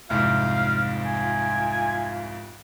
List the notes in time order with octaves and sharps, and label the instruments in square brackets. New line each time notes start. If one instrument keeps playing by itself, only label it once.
[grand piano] C2 F2 G#2 [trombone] F4 [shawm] F5
[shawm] G#5